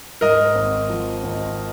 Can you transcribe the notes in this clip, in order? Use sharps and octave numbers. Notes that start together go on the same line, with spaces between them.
G#2 A#4 D#5
G#1
F3
G#1